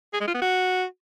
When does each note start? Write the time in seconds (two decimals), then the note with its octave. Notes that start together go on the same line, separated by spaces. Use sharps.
0.14 G#4
0.21 G#3
0.28 F4
0.35 B3
0.42 F#4